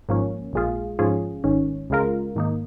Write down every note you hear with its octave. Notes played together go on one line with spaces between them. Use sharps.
G#1 G#2 F3 A#3 C#4
A#1 A#2 G#3 F4 G#4
G#2 F3 C#4 F4 G#4
G#1 G#2 D#3 C#4
C#2 C#3 G#3 F4 A#4
G#2 D#3 A#3 D#4